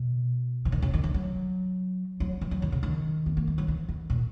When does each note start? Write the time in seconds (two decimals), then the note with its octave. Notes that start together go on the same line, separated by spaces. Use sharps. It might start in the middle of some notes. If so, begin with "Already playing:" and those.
Already playing: B2
0.65 E3
0.72 D#3
0.82 C#3
0.94 D#3
1.04 E3
1.14 F#3
2.20 F#3
2.41 E3
2.51 F#3
2.62 D#3
2.72 C#3
2.83 D#3
3.26 B3
3.37 A#3
3.47 G#3
3.58 F#3
3.68 E3
3.89 D#3
4.10 A#2